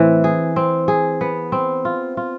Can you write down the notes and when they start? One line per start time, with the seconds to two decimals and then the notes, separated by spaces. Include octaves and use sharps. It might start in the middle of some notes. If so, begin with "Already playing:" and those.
Already playing: A2 E3 C4
0.24 G#4
0.56 C4
0.88 G#4
1.21 B3
1.52 C4
1.85 F4
2.17 F4